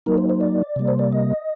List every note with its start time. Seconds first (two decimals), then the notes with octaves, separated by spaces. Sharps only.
0.06 F#3 A#3 D#4 A#4
0.18 C5
0.30 C5
0.41 D5
0.76 C3 G3 A#3
0.88 C5
0.99 D5
1.12 D#5